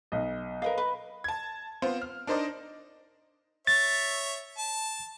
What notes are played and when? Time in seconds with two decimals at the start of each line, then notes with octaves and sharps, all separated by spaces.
0.12 B1 D#5
0.62 A#4 B4 D#5 F5
0.78 B4
1.24 A5 G#6
1.82 B3 C4 F4 C5
2.02 F6
2.27 D4 D#4 A#4 C5 D5 D#5
3.67 C#5 E5 A6
4.58 A5